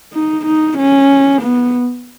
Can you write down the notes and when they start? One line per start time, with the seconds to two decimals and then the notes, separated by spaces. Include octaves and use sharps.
0.13 D#4
0.45 D#4
0.78 C#4
1.42 B3